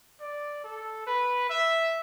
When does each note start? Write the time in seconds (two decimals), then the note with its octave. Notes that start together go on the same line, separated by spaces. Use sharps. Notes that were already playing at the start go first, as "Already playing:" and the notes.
0.21 D5
0.64 A4
1.07 B4
1.49 E5